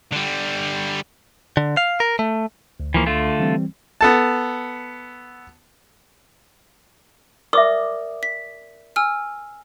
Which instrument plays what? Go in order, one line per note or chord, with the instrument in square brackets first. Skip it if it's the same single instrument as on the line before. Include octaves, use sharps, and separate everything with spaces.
[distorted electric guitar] D3 G3
[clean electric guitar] D3
F5
A#4
A3
[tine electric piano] D2
[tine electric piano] C#2 [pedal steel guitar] E3 F3 A#3
[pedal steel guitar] D3 A3 F4
[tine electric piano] E3 G3 C4
[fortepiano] B3 A4 A5
[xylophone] A#4 D5 [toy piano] E5 D6 D#6
[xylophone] B6
G#5 E6 F6